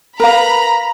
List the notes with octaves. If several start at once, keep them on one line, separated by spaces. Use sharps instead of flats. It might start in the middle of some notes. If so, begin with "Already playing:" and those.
A#4 B4 F5 A#5 B5